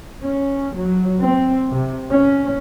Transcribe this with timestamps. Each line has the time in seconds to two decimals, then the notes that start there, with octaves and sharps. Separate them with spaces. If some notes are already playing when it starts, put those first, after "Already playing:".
0.24 C#4
0.76 F#3
1.21 C4
1.71 C3
2.11 C#4